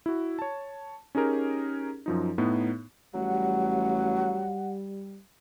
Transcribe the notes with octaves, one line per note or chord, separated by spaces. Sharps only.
E4 F#4
C#5 A5
C#4 D#4 G4 G#4 A#4
F#2 F3 D#4
A2 B3 D#4
A1 F#3 G3 F#5